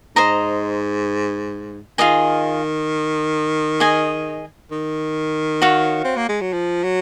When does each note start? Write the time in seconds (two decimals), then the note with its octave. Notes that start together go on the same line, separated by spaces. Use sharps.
0.16 G#2 C5 D#5 A#5
1.98 D#3 F4 G#4 D#5 G#5
3.80 G#4 D#5 G#5
4.71 D#3
5.62 F#4 C#5 F5
6.04 C4
6.17 A#3
6.29 G#3
6.41 F#3
6.53 F3
6.83 F#3